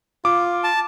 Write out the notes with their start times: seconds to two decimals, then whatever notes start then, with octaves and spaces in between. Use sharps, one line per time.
0.25 F4 D6
0.64 A5